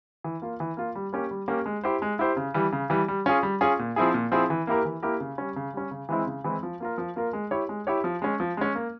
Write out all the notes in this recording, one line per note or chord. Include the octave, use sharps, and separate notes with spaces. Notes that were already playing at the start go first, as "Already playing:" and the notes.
E3
A#3 F4
E3
A#3 F4
G3
A#3 C#4 G4
G3
A#3 C#4 G4
G#3
E4 G4 C5
G#3
E4 G4 C5
C#3
E3 G3
C#3
E3 G3
G3
C#4 F4 G#4
G3
C#4 F4 G#4
A#2
F3 C4 E4 G#4
A#2
F3 C4 E4 G#4
E3
A#3 E4 G4 A#4
E3
A#3 E4 G4 A#4
C#3
G3 C#4
C#3
G3 C#4
C#3
E3 G#3 C4 E4
C#3
E3 G#3 C4 E4
F3
A#3 F4 A#4
F3
A#3 F4 A#4
G#3
E4 G4 C#5
G#3
E4 G4 C#5
F3
G#3 C#4
F3
G#3 C#4
A#3